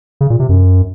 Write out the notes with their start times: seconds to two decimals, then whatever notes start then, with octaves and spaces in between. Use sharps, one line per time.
0.21 C#3
0.30 A#2
0.40 C3
0.49 F#2